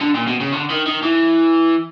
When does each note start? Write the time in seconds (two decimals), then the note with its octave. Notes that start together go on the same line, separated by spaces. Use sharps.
0.01 D3
0.15 A#2
0.27 B2
0.40 C#3
0.52 D3
0.70 D#3
0.86 D#3
1.03 E3